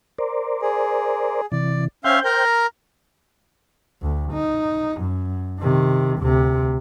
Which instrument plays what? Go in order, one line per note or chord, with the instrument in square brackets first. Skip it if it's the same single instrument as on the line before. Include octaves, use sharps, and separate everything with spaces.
[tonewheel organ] A#4 C5 D5
[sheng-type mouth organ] G#4
[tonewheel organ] C3 E3 [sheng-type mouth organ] D5
[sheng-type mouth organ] C#4 E5 F5 [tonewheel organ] C5 G5 G6
[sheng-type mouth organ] A#4 A#5
[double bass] D2
D#4
F#2
C3 D#3
D2 C3